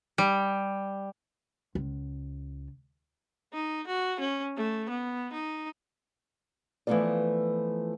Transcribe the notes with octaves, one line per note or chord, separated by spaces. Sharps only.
G3
C#2
D#4
F#4
C#4
A3
B3
D#4
E3 F3 A3 B3 F4 D5